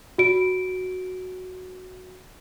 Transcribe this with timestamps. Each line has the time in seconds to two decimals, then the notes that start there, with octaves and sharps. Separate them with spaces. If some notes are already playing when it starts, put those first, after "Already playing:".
0.18 F#4 D7